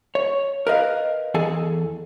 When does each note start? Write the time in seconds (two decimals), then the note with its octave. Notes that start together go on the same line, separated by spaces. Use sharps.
0.15 C#5
0.67 A#4 B4 D#5 F5
1.34 E2 G#4 A4 G#5